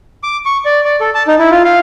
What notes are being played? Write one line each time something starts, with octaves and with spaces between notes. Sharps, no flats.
D6
C#6
D5
D5
A4
A5
D#4
E4
F4
F5